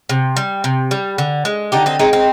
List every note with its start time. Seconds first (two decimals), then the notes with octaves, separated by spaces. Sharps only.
0.09 C3
0.37 G3
0.64 C3
0.91 G3
1.18 D3
1.45 G#3
1.72 D3 D#4 G4
1.86 C4 D#4
1.99 G#3 C4 D#4
2.13 C4 D#4